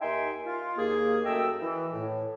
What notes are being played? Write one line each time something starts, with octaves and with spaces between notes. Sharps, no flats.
D#2 D#4 E5 G5 G#5 C6
F4
D#2 A#3 G#4
F#2 A3 D#5 G5 E6
E3
A2